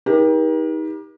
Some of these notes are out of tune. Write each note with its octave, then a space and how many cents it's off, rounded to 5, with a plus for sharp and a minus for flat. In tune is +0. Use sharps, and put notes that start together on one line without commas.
D#4 +30 G4 +20 A#4 +40